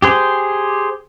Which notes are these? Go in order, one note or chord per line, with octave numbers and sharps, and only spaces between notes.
G4 G#4 C5